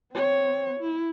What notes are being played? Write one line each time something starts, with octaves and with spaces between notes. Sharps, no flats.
C4 C#5
E4